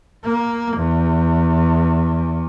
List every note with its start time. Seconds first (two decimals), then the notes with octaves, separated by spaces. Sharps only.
0.24 A#3
0.77 E2